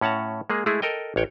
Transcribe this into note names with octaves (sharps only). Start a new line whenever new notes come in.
A2 C#4 F#5 A5 A#5
G#3 A#3 G#4
G#3 A3 E4 G#4
A4 A#4 D#5 G5
A1 C#5 G5